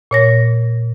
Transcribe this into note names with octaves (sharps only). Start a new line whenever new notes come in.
A#2 C#5 A#6